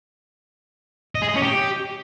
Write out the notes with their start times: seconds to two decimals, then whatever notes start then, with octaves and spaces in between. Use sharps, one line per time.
1.15 D#5
1.22 G#4
1.29 D#5
1.35 C#4
1.42 G4